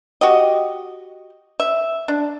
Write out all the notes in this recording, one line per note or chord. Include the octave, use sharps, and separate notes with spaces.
F#4 G4 D#5
E5
D4